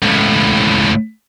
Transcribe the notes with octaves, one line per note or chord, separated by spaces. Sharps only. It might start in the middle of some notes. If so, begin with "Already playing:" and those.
C#2 A2